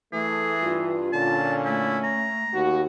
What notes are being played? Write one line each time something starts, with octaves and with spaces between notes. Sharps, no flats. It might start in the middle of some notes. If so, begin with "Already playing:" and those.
E3 A3 G#4
G2 F4
A#2 D3 C#4 A5
A3 E4
A#5
D#2 F#4